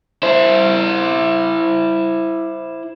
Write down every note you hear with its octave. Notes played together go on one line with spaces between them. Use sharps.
E4 C5